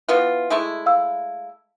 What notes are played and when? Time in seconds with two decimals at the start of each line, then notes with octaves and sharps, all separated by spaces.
0.09 E3 B3 F4
0.50 G#3 A3 E4
0.86 F5 E6